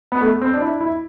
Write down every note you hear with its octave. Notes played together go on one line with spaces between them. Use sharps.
B3
A3
C4
D4
E4
E4